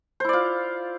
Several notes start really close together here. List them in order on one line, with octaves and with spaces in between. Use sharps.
C5 E4 D5 F4